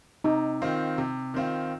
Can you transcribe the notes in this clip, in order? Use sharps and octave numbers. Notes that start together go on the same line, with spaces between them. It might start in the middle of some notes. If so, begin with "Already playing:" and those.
C3 D#4
D#3 C4 F4
C3
D#3 C4 F4